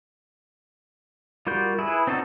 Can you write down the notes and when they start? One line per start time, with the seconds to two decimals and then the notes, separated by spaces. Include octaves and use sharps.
1.47 G3 F4 F#4 A#4 G6
1.79 E4 G#4 B4
2.07 C4 D4 D#4 F#4 A4